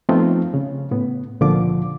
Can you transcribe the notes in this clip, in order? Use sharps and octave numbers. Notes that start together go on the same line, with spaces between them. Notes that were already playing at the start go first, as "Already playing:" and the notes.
F3 A3 B3 C4 D#4 F4
C#3
A2 B3
C#2 A#2 D3 F3 F4 D6